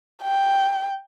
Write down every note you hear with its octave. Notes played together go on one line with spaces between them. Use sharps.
G5